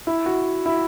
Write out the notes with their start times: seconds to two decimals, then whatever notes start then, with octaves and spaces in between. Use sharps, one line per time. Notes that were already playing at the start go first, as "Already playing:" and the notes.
0.07 E4
0.26 F#4
0.66 E4